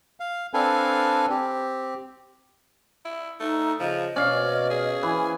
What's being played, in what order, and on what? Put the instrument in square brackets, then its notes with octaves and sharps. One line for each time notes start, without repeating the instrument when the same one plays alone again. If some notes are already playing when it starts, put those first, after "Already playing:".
[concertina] F5
C4 D4 A4 B4 F5 G#5
C4 G4
[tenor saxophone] E4
[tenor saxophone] A3 [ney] D#4
[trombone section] C#3 [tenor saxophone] F3 [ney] D#5
[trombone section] B2 [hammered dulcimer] C#4 F5 [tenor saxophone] D5
[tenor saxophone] G#4
[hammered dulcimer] E3 [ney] G#5